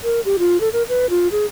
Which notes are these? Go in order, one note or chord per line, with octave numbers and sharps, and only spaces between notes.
A#4
G4
F4
A4
A#4
B4
F4
G#4